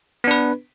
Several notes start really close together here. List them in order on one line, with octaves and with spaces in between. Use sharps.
B3 D4 B4